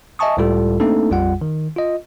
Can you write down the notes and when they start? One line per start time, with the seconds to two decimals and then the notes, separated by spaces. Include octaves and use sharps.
0.19 D#5 E5 G#5 A5 C#6 D#6
0.37 C#2 A2 G3 F4 A4
0.80 A3 A#3 C4 D4 D#4 A4
1.10 A#1 F2 G3 F4 F#5
1.42 D#3
1.76 F4 D#5